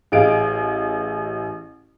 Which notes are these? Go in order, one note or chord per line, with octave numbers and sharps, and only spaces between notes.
A1 G#4 D#5 F5 D7